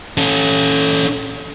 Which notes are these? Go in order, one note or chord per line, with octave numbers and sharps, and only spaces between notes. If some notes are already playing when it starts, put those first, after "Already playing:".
C#4 A4